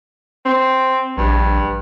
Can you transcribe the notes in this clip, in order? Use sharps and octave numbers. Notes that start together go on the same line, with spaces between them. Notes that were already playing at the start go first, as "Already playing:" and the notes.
C4
A#1 G2